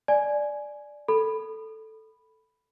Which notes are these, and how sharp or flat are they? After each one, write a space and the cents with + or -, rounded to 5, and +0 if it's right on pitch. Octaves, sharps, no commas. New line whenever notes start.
D5 +0 G#5 +15
A4 +0 B5 +0